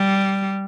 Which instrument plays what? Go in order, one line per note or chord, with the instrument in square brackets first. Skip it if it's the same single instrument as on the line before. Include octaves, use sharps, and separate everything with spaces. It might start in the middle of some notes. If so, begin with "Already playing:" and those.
Already playing: [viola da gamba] G3